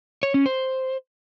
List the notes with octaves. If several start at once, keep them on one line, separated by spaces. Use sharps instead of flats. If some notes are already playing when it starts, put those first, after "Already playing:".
C#5
C#4
C5